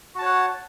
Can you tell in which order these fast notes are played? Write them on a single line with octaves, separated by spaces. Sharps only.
F#4 A5 C#5 F#5